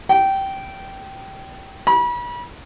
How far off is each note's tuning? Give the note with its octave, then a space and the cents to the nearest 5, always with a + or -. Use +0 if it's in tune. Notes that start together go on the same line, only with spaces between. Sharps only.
G5 -15
B5 -35